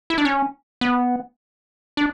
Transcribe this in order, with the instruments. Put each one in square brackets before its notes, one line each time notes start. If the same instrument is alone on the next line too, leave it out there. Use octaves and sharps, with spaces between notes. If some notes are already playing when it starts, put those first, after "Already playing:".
[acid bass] E4
D4
C#4
B3
D4